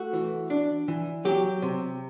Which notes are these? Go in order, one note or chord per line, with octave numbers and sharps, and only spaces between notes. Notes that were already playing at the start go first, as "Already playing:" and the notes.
Already playing: A3 F#4
E3
D4
E3
F#3 G4
C3